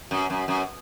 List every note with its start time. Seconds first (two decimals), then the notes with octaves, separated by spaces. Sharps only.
0.11 F#2
0.30 F#2
0.48 F#2